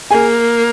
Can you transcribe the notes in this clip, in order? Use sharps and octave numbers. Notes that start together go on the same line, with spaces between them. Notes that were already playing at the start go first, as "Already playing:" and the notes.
A#3 G#4 G#5